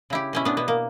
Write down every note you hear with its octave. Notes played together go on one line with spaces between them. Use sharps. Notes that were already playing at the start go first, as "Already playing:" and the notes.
C#3 E4 G4
B2 C#4 E4
B3 D4
B2 B3
A#3